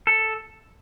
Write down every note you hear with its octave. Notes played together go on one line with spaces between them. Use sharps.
A4